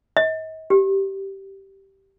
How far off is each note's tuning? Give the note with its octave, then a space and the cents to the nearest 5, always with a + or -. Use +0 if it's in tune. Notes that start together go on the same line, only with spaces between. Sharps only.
D#5 +40
G4 -10